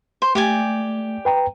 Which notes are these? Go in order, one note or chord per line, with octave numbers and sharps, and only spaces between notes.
C5
A3 G4 D5 G#5
B4 G5 A#5